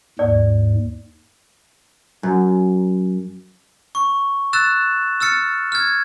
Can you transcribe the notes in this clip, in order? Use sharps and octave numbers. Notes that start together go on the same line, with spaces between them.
D#2 G#2 D5
F#2
C#6
E6 F#6 A6 E7
E6 F6 A6 C#7
F6 G#6